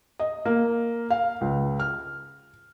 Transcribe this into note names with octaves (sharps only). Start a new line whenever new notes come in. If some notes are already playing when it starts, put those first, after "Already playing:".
D#5
A#3
F5
C#2
F6